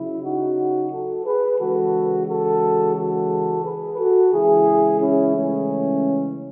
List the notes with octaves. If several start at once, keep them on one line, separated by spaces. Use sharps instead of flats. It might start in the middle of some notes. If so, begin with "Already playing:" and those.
Already playing: C#3 F#3 E4
D#4 F#4
F#4 A4
G#4 B4
C#3 E3 G#3 F#4 A4
F#4 A4
F#4 A4
G#4 B4
F#4 A4
C#3 E3 G#3 E4 G#4
C#4 E4
A3 C#4